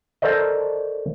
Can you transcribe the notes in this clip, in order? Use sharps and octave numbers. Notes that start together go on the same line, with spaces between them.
A4 A#4 C5 D5 D#5